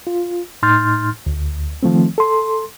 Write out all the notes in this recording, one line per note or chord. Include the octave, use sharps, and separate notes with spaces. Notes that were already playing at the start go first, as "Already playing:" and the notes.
F4
A2 D#4 C6 F6 G6 A6
D2
D#3 F3 A3 C4
A4 C6